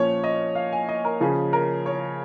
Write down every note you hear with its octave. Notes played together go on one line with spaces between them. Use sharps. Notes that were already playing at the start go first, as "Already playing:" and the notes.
Already playing: A#2 F3 C#4 C#5
D#5
F5
G#5
D#5
A#4
C#3 F3 C#4 G#4
A#4
C#5